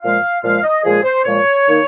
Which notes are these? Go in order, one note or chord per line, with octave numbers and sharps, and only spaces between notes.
A#2 F3 G#3 F5
A#2 F3 G#3 F5
D#5
A#2 F3 G#3 G#4
C5
A#2 F3 G#3 C#5
D#3 A#3 D#4